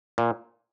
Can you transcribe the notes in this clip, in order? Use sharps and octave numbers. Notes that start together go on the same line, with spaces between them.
A#2